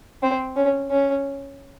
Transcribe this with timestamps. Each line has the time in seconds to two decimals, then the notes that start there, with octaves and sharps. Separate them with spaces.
0.23 C4
0.56 C#4
0.91 C#4